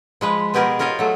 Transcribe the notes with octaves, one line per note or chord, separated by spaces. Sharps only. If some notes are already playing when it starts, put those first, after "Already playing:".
F3 G#3 B4
B2 B3 G4 G#4 A#4
F4 A#4 C#5 D#5 F5
F#3 A3